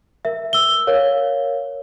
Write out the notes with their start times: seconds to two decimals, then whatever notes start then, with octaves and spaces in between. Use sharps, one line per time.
0.25 A#4 E5
0.53 E6 G7
0.87 A#4 C#5 F5